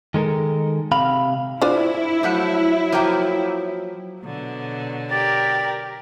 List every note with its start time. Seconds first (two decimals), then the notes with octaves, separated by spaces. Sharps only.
0.14 D#3 G#3 A4 A#4
0.92 C3 F5 B5
1.62 D4 E4 F4 C5
2.23 F3 F#3 A3 F#5
2.92 F3 A#3 G5
4.22 B2 D3 F#3
5.10 G4 A#4 D5